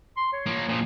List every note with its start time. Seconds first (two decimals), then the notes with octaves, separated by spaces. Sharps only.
0.17 C6
0.33 C#5
0.46 F3 A#3
0.69 A#2 F3